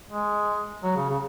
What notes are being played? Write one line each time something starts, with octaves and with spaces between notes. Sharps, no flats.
G#3
F#3
C#3
C#3